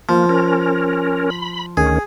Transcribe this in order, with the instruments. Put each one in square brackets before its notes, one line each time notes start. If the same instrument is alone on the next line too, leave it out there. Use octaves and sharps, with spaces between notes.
[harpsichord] F3 [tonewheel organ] A#3
[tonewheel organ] C#4 A#4
B5
[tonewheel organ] D2 D#3 C#4 [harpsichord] G#4